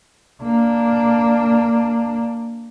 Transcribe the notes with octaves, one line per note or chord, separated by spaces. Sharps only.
A#3 D4